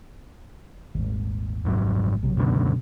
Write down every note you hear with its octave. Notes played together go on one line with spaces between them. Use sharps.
D#1 G#1
F#1 G#2 F#3
A#1 C3 F#3
C#2 F#2 B2 D3